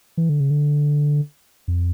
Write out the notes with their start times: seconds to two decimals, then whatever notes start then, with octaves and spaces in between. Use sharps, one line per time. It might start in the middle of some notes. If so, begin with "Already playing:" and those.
0.17 E3
0.29 D3
0.40 C#3
0.50 D3
1.68 F2